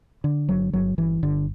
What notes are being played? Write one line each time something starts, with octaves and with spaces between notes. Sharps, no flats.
D3
G1 F#3
G1 F#3
G1 E3
G1 D3